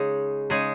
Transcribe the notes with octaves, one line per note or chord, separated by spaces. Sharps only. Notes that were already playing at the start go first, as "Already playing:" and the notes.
Already playing: C#3 G#3 D#4 G#4
C#3 G#3 D#4 G#4